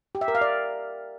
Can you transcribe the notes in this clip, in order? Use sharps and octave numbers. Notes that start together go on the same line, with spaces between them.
G4
E5
A#4
F5
D5